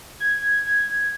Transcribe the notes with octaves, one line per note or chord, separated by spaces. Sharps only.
G#6